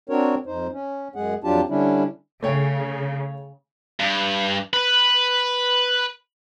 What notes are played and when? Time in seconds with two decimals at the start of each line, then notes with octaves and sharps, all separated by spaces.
0.09 C4 D4 F#4 A#4 C#5
0.46 F2 D#4 C5
0.73 C#4
1.16 F#2 G#3 G#4 F#5
1.44 F2 F#3 D4 F4 G4 A5
1.69 D3 G3 C#4 D4 E4
2.43 C#3 A3 C#5 G5
4.00 G2
4.73 B4